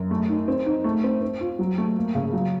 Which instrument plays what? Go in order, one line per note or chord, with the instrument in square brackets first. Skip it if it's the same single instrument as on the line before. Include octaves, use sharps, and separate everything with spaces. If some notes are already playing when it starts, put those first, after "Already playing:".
Already playing: [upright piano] F#2
A3
D#4
C4
D#4
A3
C4
C4
F4
F#3
A3
A#3
C#3
F#3